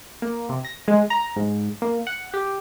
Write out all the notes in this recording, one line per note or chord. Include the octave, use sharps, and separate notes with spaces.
A#3
C3
A#6
G#3
A#5
G#2
A#3
F#5
G4